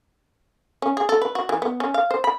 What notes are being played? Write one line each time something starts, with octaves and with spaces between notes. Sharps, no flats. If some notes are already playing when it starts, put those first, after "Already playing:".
C#4
G#4
A4
B4
F#4
E3
B3
C#4
F5
C5
B5